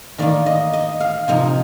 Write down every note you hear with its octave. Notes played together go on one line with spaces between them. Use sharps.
D#3 A#3 D#4 D5
D#5
D#5
F5
C3 F3 A#3 D#4